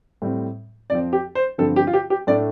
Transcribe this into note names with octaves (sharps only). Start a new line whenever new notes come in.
A2 G3 C4
F2 F3 C4 D5
G4
C5
G2 D3 F3 C4 A4
G4
F4
G4
G4
A2 A3 D4 D5